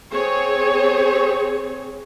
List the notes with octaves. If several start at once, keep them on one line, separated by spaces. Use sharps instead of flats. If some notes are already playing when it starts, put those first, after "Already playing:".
C4 G#4 C#5